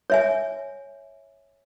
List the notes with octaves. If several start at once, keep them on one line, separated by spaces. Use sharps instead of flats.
C#5 E5 G#5